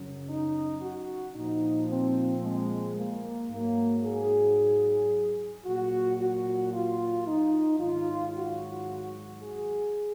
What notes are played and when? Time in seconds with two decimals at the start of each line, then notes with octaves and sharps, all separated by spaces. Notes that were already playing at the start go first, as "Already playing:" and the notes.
Already playing: F#2 C#3 F#3
0.27 D#4
0.81 F#4
1.35 A#2 F3 D#4
1.89 C4
2.42 G#3
2.96 A#3
3.49 G#2 F#3 A#3
4.03 G#4
5.64 A#2 F#3 F#4
6.18 F#4
6.72 F4
7.26 D#4
7.79 G#2 D#3 F#3 F4
8.33 F#4
9.40 G#4